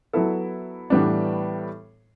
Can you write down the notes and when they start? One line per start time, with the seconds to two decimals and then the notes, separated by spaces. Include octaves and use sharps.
0.13 F#3 B3 E4 A4
0.90 A2 E3 G3 B3 D4